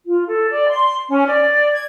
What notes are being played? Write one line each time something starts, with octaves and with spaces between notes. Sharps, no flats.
F4
A4
D5
C6
C#4
D5
G#6